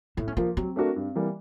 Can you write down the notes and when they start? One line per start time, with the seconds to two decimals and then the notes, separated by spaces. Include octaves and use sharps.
0.17 A2 D4
0.28 C#4
0.36 F3 A#3 D4
0.57 F#3 C4
0.76 A3 D4 F#4 A#4
0.96 G2
1.15 E3 G3 A#3